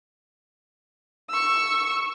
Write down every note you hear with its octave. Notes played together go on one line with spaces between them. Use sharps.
C#6 E6